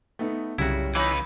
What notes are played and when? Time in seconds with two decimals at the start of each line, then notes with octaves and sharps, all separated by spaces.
0.19 A3 B3 D#4
0.58 C2 F#2 C#3 G3 E4 F#4
0.95 C#2 E3 D#4 B4 C#5